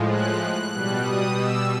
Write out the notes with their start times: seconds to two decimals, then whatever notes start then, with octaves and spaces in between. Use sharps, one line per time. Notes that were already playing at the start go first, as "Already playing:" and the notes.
Already playing: A2 F3 G#3
0.09 F#6
0.41 F#6
0.72 B2 G3
1.03 D#6
1.35 E6